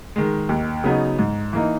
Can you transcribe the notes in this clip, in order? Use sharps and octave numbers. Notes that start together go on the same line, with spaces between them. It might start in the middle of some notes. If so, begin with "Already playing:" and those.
D#3 G#3
D#2
C#3 F#3 B3 D#4
G#2
E3 A#3 D#4